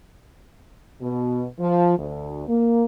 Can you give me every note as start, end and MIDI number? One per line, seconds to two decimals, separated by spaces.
1.02 1.44 47
1.60 1.94 53
1.97 2.44 38
2.48 2.84 58